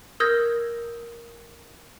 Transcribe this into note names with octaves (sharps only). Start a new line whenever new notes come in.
A#4 D#6 E6 G6 G#6 A#6